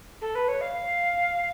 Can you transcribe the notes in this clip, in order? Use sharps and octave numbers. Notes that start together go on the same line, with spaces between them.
A4
B4
C#5
F5